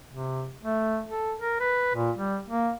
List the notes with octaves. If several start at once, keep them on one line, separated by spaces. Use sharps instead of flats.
C3
A3
A4
A#4
B4
A#2
G3
A#3